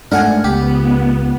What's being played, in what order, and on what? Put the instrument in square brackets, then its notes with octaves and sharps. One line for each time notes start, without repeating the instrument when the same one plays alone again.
[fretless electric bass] G#2 A3 D4 [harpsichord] A#4 F#5 G#5
[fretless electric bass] C#2 [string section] B3 [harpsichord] G4